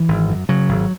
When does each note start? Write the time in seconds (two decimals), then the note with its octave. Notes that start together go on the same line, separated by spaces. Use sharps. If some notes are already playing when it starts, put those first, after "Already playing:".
Already playing: E3
0.08 G#1
0.29 F#2
0.49 C#3 F#3
0.69 G#1